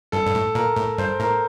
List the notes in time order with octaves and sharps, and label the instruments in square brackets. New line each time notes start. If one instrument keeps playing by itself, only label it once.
[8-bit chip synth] G2 [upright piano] A4
[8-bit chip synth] G2
A2
[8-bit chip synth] A#2 [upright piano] A#4
[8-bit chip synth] A2
[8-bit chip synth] G2 [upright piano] C5
[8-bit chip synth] A2 [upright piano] A#4